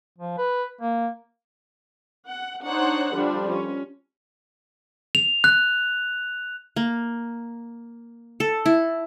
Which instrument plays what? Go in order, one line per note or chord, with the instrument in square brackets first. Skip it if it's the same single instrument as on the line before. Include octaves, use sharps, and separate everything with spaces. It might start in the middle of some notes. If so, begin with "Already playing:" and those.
[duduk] F3
B4
A#3
[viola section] F#5
D4 D#4 C5 C#5 F#5
D3 F3 G3 D4
C#4
[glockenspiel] F7
F#6
[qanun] A#3
A4
E4